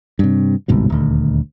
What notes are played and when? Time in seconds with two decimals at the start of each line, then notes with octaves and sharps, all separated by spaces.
0.19 G2 C3
0.68 G1 C2 G#2 B2
0.90 D#1 D2